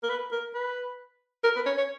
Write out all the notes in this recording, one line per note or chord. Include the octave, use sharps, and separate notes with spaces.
A#4
B4
A#4
B4
A#4
B4
C#5
C#5